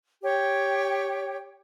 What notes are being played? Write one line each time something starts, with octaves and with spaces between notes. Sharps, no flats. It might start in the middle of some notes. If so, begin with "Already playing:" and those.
G4 C#5 G5